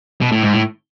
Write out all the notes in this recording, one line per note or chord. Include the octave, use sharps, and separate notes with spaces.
B2
A2
G#2
A2